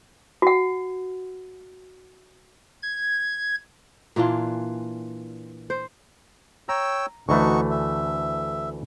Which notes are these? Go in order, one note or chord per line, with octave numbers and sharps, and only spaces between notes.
F#4 F#5
G#6
A#2 E3 D4 F4
C5
C#5 G5 A#5 E6
D2 E3 A3 D#4 F#4 C#6
E5